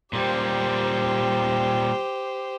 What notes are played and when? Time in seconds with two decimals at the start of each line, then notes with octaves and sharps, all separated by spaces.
0.13 A#2 G3 G4 C5